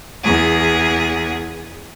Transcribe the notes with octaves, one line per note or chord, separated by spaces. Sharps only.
E2 G#4